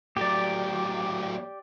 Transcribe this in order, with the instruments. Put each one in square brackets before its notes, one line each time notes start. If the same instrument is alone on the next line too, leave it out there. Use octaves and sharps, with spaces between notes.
[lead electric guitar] A2 F#3 [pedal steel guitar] G4 D5